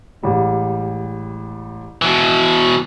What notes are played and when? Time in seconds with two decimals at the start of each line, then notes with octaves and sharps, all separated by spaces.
0.23 A1 G3 G#3
2.02 B2 E3